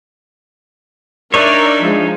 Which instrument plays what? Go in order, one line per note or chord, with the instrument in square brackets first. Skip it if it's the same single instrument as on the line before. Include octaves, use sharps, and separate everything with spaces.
[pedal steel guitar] D4 D#4 C#5 [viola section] A#4 D5 E5
[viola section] F3 G#3